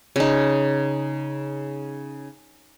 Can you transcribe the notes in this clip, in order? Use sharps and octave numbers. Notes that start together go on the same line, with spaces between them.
C#3 D#4